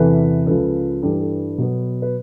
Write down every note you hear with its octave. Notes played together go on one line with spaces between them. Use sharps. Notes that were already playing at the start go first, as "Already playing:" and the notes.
Already playing: E2 C3 E3 A4 B4
C#2 C#3 F3 A4 B4
G2 E3 G3 A4
A4
B2 F#3 B3
B4